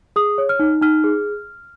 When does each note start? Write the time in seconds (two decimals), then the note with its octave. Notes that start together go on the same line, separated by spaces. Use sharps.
0.16 G#4 D#6
0.38 C#5
0.49 F6
0.60 D#4
0.82 D#4 F6
1.04 G#4